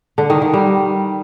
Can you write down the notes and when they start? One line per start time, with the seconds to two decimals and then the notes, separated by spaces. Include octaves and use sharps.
0.18 D3
0.30 D#3
0.42 D#3
0.54 G3